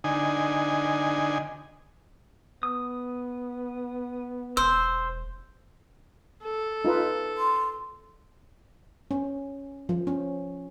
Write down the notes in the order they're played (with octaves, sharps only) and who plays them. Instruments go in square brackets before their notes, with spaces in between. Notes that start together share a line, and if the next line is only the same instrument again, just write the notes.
[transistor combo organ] D3 D#4 G#5
[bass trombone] B3 [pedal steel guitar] D#6
[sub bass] E1 [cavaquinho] C5 [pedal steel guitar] E6
[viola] A4
[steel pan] D#4 F4 B4
[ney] C6
[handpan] C#4
F3
C#4